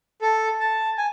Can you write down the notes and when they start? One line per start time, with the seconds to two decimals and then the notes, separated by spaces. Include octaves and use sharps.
0.22 A4
0.60 A5
0.98 G#5